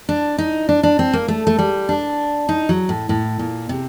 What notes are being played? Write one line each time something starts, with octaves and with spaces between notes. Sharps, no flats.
D4
D#4
D4
D4
C4
A#3
A3
A3
G3
D4
D#4
F#3
A2
A2
A#2
C3